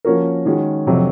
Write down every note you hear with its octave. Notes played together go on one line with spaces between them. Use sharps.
F3 A#3 C#4 F#4 A#4
D#3 G#3 C#4 F#4
F2 C3 F#3